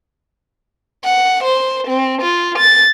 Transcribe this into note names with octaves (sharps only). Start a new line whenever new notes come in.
F#5
C5
C4
F4
A6